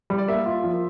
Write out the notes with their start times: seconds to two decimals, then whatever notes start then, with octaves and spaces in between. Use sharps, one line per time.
0.10 G3
0.18 D5
0.28 A#3 E5
0.46 F4
0.63 F3